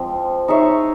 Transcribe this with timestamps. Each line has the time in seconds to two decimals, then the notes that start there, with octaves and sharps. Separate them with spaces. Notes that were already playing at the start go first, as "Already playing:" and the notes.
Already playing: F3 G#3 C4
0.48 D#4 G#4 C#5 E5